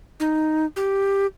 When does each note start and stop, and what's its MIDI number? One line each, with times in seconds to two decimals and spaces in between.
0.20 0.66 63
0.76 1.27 67